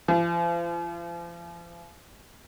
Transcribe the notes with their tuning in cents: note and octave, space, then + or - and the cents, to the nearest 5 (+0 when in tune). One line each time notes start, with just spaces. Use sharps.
F3 -40